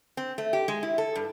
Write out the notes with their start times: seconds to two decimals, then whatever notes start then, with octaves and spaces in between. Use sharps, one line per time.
0.17 C4
0.38 A3
0.53 G4
0.68 G#3
0.83 E4
0.98 A4
1.16 G2